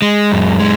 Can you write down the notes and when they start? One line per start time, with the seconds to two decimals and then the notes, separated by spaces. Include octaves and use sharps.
0.02 G#3
0.32 F#2
0.60 G#3